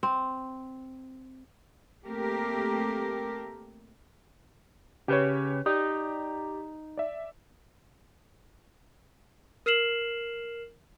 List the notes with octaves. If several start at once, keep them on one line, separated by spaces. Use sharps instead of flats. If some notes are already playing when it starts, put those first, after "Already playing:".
C4
A3 A#3 C4 G4 A4 A#4
C#3 G4 B4 C#5
D#4 G4 D5
D5 E5
A#4 F6 C7 E7 F#7